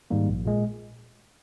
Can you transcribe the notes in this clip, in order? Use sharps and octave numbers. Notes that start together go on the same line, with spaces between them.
G#2 D#3 G3 A#3
A#1
A#2 G#3